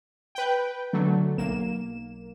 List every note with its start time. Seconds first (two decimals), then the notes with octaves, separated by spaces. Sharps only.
0.35 B4 G5
0.93 D3 F#3 A3
1.37 B1 A#3 E7